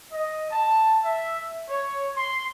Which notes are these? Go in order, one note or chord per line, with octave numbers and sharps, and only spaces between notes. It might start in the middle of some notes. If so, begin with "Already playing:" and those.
D#5
A5
E5
C#5
C6